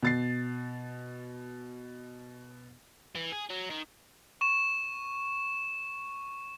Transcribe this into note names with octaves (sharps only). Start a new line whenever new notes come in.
B2 A6 C7
E3
G#4
F#3
D#3
C#6 E7